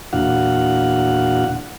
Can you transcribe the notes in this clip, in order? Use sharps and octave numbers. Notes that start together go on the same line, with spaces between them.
E2 A#2 D4 F#4 F5 F#5